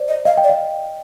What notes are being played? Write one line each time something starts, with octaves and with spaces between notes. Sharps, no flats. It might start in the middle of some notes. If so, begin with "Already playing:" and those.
Already playing: C5 D5
D#5
D#5 F5
G5
D5
F5